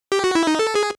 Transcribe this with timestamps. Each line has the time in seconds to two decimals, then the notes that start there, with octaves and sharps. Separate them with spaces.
0.12 G4
0.24 F#4
0.35 E4
0.47 D#4
0.59 A4
0.75 G#4